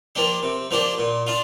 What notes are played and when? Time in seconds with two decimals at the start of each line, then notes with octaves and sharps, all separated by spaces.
0.15 F3 A#3 D4 G4
0.43 C3
0.71 F3 A#3 D4 G4
0.99 A#2
1.27 D4 F4